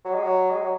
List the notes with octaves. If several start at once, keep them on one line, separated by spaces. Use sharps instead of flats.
F#3
G#3
F#3
G#3
F#3